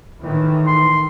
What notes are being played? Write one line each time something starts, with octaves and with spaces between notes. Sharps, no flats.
A2 D#3 E3
C6